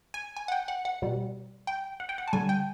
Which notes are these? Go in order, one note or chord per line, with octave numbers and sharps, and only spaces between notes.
G#5
G#5
F#5
G5
F#5
F#5
B2 G3
G5
F#5
G5
F#5
A5
D3 G3 G#5
G5